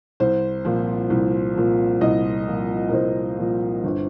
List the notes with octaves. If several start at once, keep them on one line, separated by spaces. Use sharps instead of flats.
C2 C5
A#2 F3
C2
A#2 F3
C2 D#5
A#2 F3
A#4
C2 C5
A#2 F3
G1